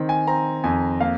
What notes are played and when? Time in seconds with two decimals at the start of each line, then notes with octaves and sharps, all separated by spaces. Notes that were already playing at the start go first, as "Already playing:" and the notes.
Already playing: D#3 C4
0.09 G#5
0.27 C4 A#5
0.64 F2 G#5
1.01 A#3 F5